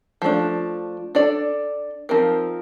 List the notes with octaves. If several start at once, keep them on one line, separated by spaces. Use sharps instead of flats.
F3 A3 D4
D4 A4 D5
F3 C4 D#4 A#4